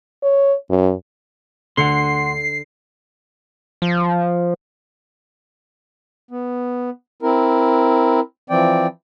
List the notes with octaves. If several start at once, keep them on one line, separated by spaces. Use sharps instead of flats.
C#5
F#2
D2 D3 F#5 C6 C7 C#7
F3
B3
C4 E4 A#4
E3 F3 C4 D5 G5